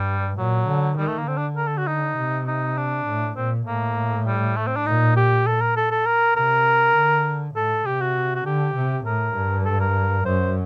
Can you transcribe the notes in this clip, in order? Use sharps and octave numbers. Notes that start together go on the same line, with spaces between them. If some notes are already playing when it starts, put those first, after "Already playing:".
Already playing: G2 G3
A#2 F#3
D3
D#3 G3
A3
A#3
D3 C4
D4
A#4
A4
F#4
D#4
C3
D#4
D4
A2
A#2 C4
A2 A#3
G3
A3
C4
D4
A#2 D#4
G4
A4
A#4
A4
A4
A#4
C3 A#4
D3
A2 A4
C3 G4
F#4
F#4
D3 G4
C3
A2 A#4
G2
A4
A#4
F#2 C5